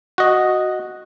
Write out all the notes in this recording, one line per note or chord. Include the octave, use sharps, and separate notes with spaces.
F#4 D#5